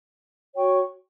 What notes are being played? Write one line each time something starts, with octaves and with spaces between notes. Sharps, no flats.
F#4 C#5 G5 C#6